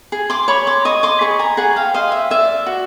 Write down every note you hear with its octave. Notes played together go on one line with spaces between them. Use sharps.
G#4
C6 D6
C#5 B5 C#6
C6 D6
D#5 C#6 D#6
C6 D6
G#4 B5 C#6
G#5 A#5
G#4 F#5 G#5
F5 G5
C5 D#5 F5
E5
D5 E5
F#4